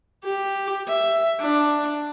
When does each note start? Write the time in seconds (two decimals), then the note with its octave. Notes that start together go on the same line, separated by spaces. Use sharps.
0.24 G4
0.89 E5
1.41 D4